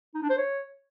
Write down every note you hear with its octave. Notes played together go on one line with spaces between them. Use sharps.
D#4
D4
C5
C#5